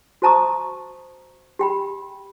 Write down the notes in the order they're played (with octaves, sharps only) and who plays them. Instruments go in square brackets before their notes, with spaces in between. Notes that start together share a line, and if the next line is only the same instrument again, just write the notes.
[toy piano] F#4 C5 A5 A#5 C#6 D#6
G4 G5 B5